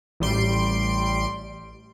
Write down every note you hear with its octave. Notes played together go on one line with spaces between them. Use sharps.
A1 G3 C6 D7